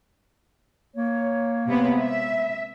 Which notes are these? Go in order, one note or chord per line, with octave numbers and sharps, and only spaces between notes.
A#3 C#5
C3 G#3 B3
E5